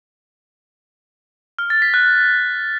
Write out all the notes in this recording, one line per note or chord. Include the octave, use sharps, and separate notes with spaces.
F6
A6
B6
F#6